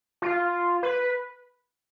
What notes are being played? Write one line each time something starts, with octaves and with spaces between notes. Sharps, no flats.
F4
B4